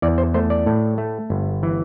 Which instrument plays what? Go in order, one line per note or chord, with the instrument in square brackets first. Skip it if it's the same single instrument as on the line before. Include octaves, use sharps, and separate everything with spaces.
[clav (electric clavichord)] E2 D5
C5
A3 C5
D5
A2
A3
G1
E3